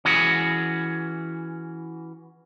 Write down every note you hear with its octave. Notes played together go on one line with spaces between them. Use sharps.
E3 C#4 F#4 G#4